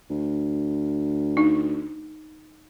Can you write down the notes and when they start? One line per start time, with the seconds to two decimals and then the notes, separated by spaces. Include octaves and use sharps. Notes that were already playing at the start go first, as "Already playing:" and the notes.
0.10 D2
1.37 D#4